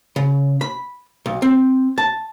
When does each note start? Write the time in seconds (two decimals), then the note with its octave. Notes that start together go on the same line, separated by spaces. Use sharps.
0.16 C#3
0.61 B5
1.26 B1
1.42 C4
1.98 A5